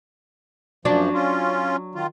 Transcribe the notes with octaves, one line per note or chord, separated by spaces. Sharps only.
F#2 F3 F#3 D4
C#4 F4
D#3 F4